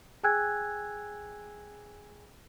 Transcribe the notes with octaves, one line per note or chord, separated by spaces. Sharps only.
G#4 G5 G#5 E6 F#6 G#6